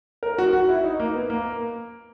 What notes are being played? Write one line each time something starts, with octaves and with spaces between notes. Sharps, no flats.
A#4
F#4
F#4
E4
D#4
A#3
B3
A#3